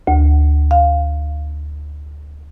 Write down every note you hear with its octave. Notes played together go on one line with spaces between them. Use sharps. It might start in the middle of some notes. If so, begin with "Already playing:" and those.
D2
F5